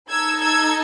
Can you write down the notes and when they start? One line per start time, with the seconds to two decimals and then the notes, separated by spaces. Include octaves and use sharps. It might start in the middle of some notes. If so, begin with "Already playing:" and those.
0.11 D#4 A4 E6 G#6
0.43 E6 G#6